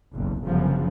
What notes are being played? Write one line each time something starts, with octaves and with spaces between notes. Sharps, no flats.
F#1 B1 E2
G1 F#2 C#3 F3